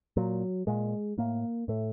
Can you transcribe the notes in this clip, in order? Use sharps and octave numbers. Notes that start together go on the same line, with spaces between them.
A#2 F#3
A#2 G#3
A2 A#3
A2 A3